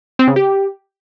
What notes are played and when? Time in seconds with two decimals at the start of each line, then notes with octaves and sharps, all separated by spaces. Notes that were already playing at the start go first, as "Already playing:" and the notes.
0.19 C4
0.28 C#3
0.36 G4